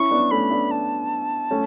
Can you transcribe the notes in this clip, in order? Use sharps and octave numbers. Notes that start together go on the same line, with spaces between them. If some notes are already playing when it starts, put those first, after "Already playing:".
Already playing: C#4 E4 C#6
B3 D4
A3 C#4 B5
B3 D4
A5
A3 C#4